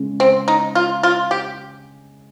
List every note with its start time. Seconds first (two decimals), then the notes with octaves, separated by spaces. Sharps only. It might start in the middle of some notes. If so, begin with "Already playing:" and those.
Already playing: C#3 G#3 C#4
0.20 C4
0.48 D#4
0.75 F4
1.03 F4
1.31 G4